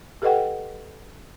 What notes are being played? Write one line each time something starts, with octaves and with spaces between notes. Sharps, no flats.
G4 A4 B4 D#5 F#5 G5